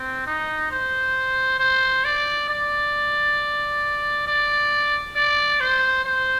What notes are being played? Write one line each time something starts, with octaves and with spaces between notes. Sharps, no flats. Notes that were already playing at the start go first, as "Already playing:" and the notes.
Already playing: C4
D#4
C5
C5
D5
D5
D5
D5
C5
C5